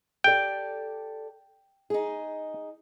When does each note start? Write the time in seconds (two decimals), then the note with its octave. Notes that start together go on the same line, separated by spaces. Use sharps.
0.24 G4 A4 D5 G5
1.90 D#4 G#4